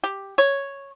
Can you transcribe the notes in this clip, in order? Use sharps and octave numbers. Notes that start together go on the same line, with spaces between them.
G4
C#5